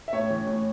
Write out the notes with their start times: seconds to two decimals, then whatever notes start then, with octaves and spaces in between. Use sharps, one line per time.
0.08 E5
0.13 A2 C#5
0.30 E3
0.47 A2